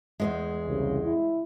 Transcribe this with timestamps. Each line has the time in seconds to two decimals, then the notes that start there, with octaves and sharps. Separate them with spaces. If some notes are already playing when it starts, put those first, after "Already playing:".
0.20 E2 G#2 G#3
0.67 C2 C#3
1.05 E4